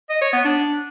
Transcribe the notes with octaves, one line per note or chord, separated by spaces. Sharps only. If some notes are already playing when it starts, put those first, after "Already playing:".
D#5
C#5
B3
D4